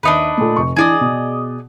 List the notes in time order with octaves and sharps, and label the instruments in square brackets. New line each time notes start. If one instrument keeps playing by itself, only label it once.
[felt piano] D#2 E5 [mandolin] D4 D#4 B4
[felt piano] A#2 A3
F1 C#6
[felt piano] E3 D4 E4 [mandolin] G#4 D5 D#5
[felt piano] B2